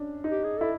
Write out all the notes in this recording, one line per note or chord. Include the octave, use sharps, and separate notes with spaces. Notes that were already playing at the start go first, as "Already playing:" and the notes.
Already playing: C#4 D4
D#4
G4
G#4
E4 A4